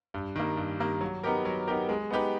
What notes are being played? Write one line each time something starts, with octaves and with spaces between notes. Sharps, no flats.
G2
D#3 G3 A#3
G2
D#3 G3 A#3
F#3
B3 D#4 G4 A#4
F#3
B3 D#4 G4 A#4
G#3
B3 D#4 G4 B4